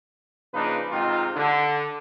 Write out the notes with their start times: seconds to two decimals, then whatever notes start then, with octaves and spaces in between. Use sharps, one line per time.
0.54 C#3 F3 A#3 D4 D#4 B4
0.91 G#2 C3 D#3 C4 D#4 F4
1.36 D3